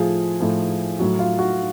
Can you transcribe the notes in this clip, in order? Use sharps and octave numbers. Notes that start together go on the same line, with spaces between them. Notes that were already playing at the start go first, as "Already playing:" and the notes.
Already playing: A2 F3 F4 G#4
A2 F3
A2 F#3 F#4
F4
F#4